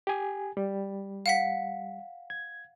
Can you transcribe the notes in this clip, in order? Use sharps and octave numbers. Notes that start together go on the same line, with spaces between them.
G4 G#5
G3
F5 F#5 B6
G#6